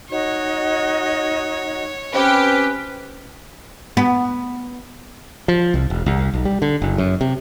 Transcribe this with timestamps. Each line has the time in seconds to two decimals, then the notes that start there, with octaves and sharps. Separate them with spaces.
0.10 D#4 F#4 C#5 D#5
2.15 C4 C#4 G4 B4
3.97 B3
5.48 F3
5.74 C2
5.90 E1
6.06 C2
6.34 B1
6.45 G3
6.62 D3
6.82 F#1
6.98 F#2
7.21 C3